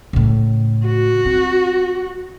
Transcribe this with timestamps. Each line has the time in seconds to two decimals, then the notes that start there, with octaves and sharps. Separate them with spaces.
0.13 A2 C#3
0.86 F#4
1.25 C4